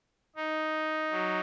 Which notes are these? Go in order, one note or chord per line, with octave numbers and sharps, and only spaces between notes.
D#4
F#3